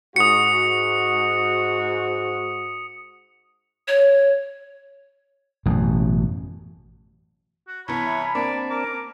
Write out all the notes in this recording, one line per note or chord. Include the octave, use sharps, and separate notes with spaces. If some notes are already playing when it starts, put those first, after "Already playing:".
G#2 F#4 D#6 C#7
C#5
A1 F#2 B2
F#4
C2 E3 B3 C#5 A#5 B5
E5
A#3 C4 D4 D5 A5
A#4 A#5 D6